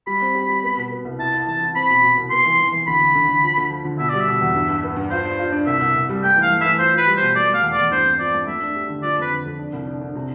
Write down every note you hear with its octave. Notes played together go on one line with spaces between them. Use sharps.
G3 B5
C4
G4
G3
B3
B2
B3
C2
E4 A5
E4
E3 A5
E4
C4 B5
B2
B2
C2
B3 C6
E3
E3
E3
D2 B5
D2
D3
D3
F3
D2
F3
D3
B2 E5
G3 D5
E5
B2
E2
G2
G2
B3
G2
F4 C5
D4
F4
D4
C2 E5
C2
C2
G3
A3 G5
E3
F5
A3
E3 E5
F4 C5
F4 B4
G3
B2 C5
A3 D5
A3 F5
E2
E2 D5
G2 C5
C4
F3 D5
A3
A3 E5
D4
G4
D3
F3 D5
F2 B4
D3
F2
D4
C2
D4
D4
C3